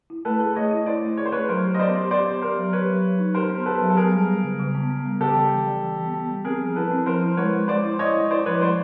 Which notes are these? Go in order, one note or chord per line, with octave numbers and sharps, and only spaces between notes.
E4
A3 A4 B4
G#4
A3 C#5 D#5
E4
E4 C5 D5
A3
G#4 C#5
C5
A3 B4 C#5
F#3 A#4 C5
G4
D#5
B3 C5 D5
G4
G4 C5 D5
B3
G4 A#4 C5
F#3
G4 B4 C#5
F#3
F#3
D#4
G4 A#4 C5
B3
G4 A4 B4
F#3
A4
B3 G#4 A#4
G3
G3
C#3
C#3
B3
B3
G3
C#3 G4 A4
E3
G3
E3
E3
B3
B3
G3
C4 G#4 A#4
F3
E4 A4 B4
C4
F3 A#4 C5
E4
G#3 B4 C#5
G#3
G#3 C5 D5
E4
E4 C#5 D#5
G#3
E4 C5 D5
F3 B4 C#5
G#3 C5 D5